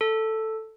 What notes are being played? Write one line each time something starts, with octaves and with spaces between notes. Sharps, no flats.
A4